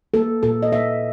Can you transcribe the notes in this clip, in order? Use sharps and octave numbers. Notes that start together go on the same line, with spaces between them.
A#3 A4
A#2 A4
D#5
A#2 E5